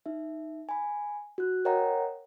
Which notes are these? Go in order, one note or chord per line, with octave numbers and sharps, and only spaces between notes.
D#4 E5
G#5 B5
F#4 F#6
A#4 C#5 D#5 F#5 G5 A#5